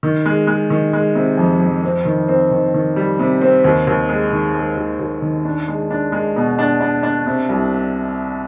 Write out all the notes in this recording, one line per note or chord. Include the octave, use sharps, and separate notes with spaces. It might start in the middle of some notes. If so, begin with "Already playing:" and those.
D#3
G#3
G#3
D#3
G#3
C3
F2
F2
C4
D#3
C4
D#3
D#3
G3
C3
C4
D#2
D#2
G#3
D#3
G#3
D#2
D#2
D#3
D4
G#3
D4
G#3
B2
D4
D4
D4
C3
C2